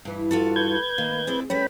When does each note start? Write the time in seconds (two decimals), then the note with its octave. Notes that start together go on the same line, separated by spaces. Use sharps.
0.05 G2 E3 E4
0.31 F4 F#4 A4
0.56 B4 G6 G#6
0.98 D#3 A#3
1.27 C4 E4 G#4 D5
1.50 G3 A3 B3 C#4 G5 B5